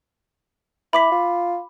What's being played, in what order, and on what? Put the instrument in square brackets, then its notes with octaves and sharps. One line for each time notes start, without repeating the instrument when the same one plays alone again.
[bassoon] E4 [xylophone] B5 D6 B6
[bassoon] F4